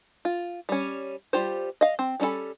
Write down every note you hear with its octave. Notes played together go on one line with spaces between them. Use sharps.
F4
G3 C#4
G3 F4 G4 C5
D#5 F5
C4
G3 C#4 D4 A4 B5